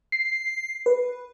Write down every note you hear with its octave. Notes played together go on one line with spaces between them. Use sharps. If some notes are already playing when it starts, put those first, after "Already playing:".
C7
B4